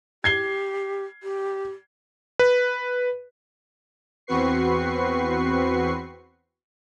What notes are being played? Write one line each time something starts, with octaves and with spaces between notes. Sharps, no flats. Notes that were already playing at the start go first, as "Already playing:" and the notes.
G4 G#6 C7 G7
G4
B4
E2 C4 F#4 B4 C#6 C7